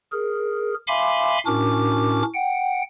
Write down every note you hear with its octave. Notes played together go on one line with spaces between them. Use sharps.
G#4 A#4
E5 F5 G#5 B5 C6 D6
A2 C#4 D4 F#4 A#4 D6
F#5 G5